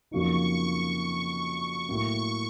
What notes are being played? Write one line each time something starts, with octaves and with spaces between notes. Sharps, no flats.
F2 C#3 F#3 A#3 D#4 C#6
A2 F#3 A#3 C#6